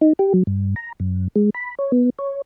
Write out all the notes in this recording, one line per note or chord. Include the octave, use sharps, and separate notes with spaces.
D#4
G4
F#3
G2
A#5
F#2
G#3
B5
C#5
B3
C#5